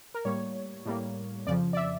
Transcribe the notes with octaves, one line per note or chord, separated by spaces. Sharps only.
A#4
A2 G3 A#3 C#5
A2 G3 A#3
F2 C#3 F3 D5
D5
E5